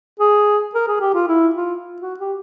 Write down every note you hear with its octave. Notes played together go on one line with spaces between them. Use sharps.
G#4
A#4
G#4
G4
F4
E4
F4
F#4
G4